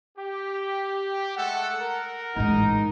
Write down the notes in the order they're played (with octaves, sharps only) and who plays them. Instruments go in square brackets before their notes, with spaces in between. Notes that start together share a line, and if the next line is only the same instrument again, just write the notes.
[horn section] G4
[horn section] G#3 A3 A4 [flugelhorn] F#5
[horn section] A#4
[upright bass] A1 G#2 [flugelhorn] D#4